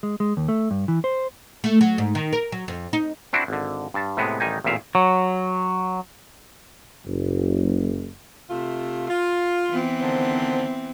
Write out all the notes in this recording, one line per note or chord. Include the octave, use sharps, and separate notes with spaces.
G#3
G#3
D#2
A3
G2
E3
C5
A3
F#3
G#2
D#3
A#4
F#3
F2
D#4
C4 D4 E4 F#4
G#1 D3
G2 A5
A2 C3 G#3 B3
A1 D#3 G3 D#4 G#5
A1 E2 A#2 E5 F5
F#3
F#1
C3 A3 F4
F4
E3 B3 C4
D3 D#3 C5